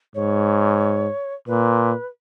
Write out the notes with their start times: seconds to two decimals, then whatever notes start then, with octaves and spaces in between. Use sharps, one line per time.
0.15 G#2 C#5
1.47 A#2 B4